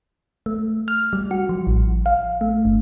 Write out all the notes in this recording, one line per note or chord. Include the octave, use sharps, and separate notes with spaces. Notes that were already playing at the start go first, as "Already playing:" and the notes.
A3
F6
G3
F#4
F3
A1
F5
A3
G1